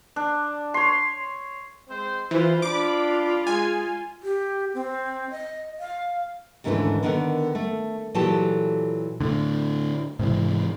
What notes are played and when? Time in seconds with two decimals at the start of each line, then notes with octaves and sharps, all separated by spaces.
0.16 D4
0.74 C#5 C6
1.89 G#3 C4 C5
2.31 E3 F4 B4 C5
2.62 D4 F4 B5 D6
3.47 G#3 G#5
4.23 G4
4.74 C4
5.31 D#5
5.79 F5
6.64 D#2 G#2 D3 E3 A3 C#4
7.03 D3 D#3 B3 A#4 F#5
7.55 A3
8.14 A#2 E3 F#3 G4 A4 A5
9.21 A2 D3
10.19 G#2 C3 E3